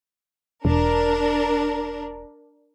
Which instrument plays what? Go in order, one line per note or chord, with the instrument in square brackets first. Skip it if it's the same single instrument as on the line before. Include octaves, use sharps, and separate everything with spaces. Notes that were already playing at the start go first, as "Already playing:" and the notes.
[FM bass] E1 [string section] D4 A#4